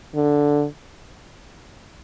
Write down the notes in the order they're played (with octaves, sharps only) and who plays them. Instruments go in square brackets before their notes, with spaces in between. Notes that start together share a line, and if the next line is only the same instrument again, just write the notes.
[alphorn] D3